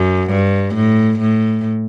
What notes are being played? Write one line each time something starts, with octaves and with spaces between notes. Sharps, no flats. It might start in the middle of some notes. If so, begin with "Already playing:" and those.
Already playing: F#2
G2
A2
A2